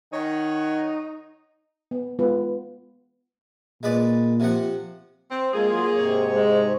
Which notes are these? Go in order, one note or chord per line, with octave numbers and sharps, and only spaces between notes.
D#3 D#4 C#5 F#5
B3
G#3 B3 F4 B4
A#2 G#3 B4 D5
C3 F3 F#5
C4
G#3 A#3 F4 G#4
F#3 F4
G#2 C3 C#5
G#3